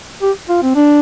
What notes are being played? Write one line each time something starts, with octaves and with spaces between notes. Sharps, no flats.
G4
F4
C4
D4